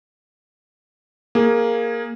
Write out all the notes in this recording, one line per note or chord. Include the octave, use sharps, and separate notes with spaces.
A#3 G#4